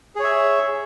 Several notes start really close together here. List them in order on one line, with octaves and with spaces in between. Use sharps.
G#4 C#5 E5